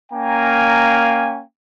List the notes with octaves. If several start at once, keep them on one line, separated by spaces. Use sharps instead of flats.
A#3 C#4 F5 G5 G#5 A#5